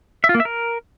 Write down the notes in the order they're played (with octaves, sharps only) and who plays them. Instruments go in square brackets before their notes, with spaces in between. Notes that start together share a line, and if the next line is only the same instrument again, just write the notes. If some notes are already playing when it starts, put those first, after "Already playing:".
[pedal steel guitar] E5
F4
A#3
E5
A#4